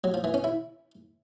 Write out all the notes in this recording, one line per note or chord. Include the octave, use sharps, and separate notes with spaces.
F#3
F3
E3
C#4
E4